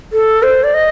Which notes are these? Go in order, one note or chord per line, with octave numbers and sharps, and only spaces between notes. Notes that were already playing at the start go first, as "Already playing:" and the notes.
A4
C5
D5
D#5